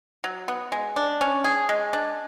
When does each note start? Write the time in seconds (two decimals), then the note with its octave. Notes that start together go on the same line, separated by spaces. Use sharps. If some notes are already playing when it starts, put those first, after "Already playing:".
0.24 F#3
0.48 B3
0.72 G#3
0.96 D4
1.21 C#4
1.44 G#4
1.69 G#3
1.93 D4